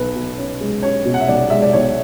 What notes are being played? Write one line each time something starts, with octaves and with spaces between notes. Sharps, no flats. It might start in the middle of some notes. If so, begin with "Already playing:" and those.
Already playing: B1 B4
B2
C#4
G#3
C#4 C#5
B2
F#5
E5
B1 D5
G#3 E5
D5
B1 C#5